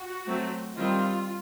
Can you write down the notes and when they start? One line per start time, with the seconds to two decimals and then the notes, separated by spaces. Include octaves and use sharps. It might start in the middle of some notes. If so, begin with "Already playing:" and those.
Already playing: F#4
0.26 F#3 A3 C4
0.76 D#3 G3 C4 F4